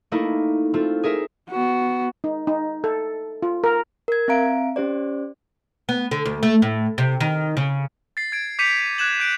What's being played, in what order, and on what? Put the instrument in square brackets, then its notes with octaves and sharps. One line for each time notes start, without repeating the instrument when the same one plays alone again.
[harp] A3 A#3 D#4 E4
A3 C4 F4
G#4 A#4 E5
[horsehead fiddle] B3 F#4
[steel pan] D#4
D#4
A4
F4
A#4
[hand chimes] A#4 G#6
C4 E5 F5 A#5 D7
C#4 G4 C5 D5
[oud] B3
D3
D2
A3
A2
C3
D#3
C#3
[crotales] A6 C7
G#6 D7
D6 G6 B6 C#7 D#7 F7
F#6 G#6 E7 F#7
G6 D7